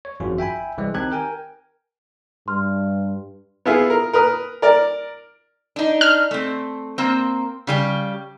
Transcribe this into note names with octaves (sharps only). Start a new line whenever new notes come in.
C#5
G#1 F#2 F3 F4 F#4
E5 G5 G#5 B5
C2 E3 G#3
D#3 C4 D#4 G4 F#6 G#6
A#4 G5 G#5
G2 C6 F6
B3 E4 F4 G#4
A#4
A#4 B4 D#6
A#4 D5
D4 D#4
F6
A3 C4
A#3 C4
C#3 G3 G4